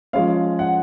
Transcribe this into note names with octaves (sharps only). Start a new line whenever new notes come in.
F3 G#3 C#4 F5
F#5